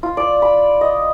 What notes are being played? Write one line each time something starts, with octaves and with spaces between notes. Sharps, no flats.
F4
D5
B5
D#5